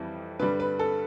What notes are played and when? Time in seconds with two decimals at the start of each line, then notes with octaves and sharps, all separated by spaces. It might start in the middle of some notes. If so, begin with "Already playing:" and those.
Already playing: F2 E3 G3
0.39 G2 D3 G3 B4
0.60 B4
0.79 A4